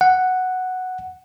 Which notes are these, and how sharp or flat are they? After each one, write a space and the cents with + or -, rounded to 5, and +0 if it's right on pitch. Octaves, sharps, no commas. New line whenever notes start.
F#5 +0